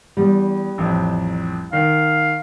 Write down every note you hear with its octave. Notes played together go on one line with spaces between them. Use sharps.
E2 G3
A1 F2
D#3 F5